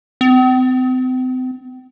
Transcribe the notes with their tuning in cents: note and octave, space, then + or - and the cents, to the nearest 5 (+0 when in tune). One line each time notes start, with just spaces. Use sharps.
C4 -40